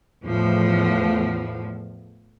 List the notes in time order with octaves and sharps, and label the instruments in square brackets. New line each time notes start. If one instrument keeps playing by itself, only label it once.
[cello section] E2 A2 F3